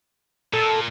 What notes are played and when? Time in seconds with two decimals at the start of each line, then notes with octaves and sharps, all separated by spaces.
0.53 A#2 A4